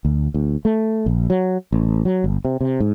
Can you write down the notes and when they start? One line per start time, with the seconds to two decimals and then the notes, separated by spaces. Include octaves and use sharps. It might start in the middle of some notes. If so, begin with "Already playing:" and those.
0.05 D2
0.34 D2
0.65 A3
1.06 A#1
1.30 F#3
1.72 A1
2.05 F#3
2.24 G1
2.45 C3
2.61 C3
2.80 G#2